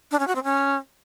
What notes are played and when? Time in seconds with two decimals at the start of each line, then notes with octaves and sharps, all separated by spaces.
0.11 D4
0.19 C#4
0.27 F#4
0.36 C4
0.44 C#4